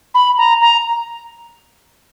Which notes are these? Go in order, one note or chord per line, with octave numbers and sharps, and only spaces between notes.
B5
A#5
A#5